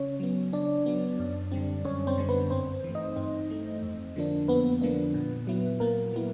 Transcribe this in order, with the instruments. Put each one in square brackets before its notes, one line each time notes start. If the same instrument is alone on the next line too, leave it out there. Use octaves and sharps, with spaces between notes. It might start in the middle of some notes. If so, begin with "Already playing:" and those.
Already playing: [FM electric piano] C#3 C#4 C#5
F#3 B3
C#3 D4 D5
F#3 B3
F#2
D3 G3 C4
F#2 C#4 C#5
C4 C5
D3 G3 C4
B3 B4
G2 C4 C5
E3 A3
D#4 D#5
G2 C4 C5
E3 A3
F2
D3 F3 A#3 D4
F2 B3 B4
D3 F3 A#3 D4
A#2
F#3 B3 E4
A#2 A#3 A#4
F#3 B3 E4